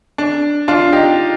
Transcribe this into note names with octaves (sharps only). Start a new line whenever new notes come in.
D4
D4 F4
D#4 G4